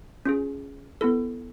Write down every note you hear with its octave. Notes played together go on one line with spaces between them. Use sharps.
C#4 F4 G#4
B3 E4 A4